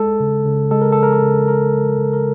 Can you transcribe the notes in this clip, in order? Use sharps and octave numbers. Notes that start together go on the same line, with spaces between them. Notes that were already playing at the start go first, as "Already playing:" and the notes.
Already playing: G#3 A4
C#3
C#3
G#3 A4
A#4
F3 A4
A#4
A4
C#3
C#3 A#4
G#3
C#3
A#4